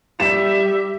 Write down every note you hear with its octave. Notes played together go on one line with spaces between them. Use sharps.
G3 G4 E5 E7